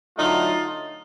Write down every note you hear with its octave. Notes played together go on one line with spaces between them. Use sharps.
D3 F#3 A3 D#4 F4